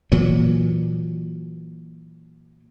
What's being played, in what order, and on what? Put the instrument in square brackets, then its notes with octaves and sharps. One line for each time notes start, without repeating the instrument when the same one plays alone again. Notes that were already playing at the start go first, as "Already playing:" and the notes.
[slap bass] A#2 E3 F#3